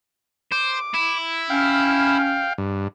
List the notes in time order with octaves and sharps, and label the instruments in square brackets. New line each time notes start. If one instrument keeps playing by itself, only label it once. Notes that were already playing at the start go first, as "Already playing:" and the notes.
[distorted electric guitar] C5 [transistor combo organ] D6
[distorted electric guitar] E4
[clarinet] C#4 [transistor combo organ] F5 G5
[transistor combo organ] G2